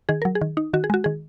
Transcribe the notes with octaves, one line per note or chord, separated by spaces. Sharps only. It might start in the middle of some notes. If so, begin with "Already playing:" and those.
D#3 G#4
F#3 A#4
G#4
D#3
D#4
D#3 F#4
G#4
G#3 F#4
D#3 G#4